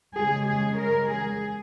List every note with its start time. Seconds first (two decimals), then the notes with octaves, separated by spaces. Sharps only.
0.16 C#3 G#3 G#4
0.48 G#4
0.79 A#4
1.11 G#4